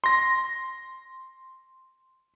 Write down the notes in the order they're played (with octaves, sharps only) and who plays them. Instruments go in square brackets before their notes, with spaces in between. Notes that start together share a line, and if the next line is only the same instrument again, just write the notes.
[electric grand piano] C6 A#6